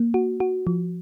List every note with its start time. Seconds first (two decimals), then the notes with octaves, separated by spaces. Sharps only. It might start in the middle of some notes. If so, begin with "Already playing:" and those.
Already playing: A#3
0.14 F#4
0.40 F#4
0.67 F3